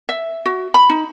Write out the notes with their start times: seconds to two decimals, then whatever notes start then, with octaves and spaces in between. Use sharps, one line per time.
0.09 E5
0.46 F#4
0.74 B5
0.90 D#4